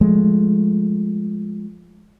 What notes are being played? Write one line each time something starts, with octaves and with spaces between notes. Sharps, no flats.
F3 G#3 A3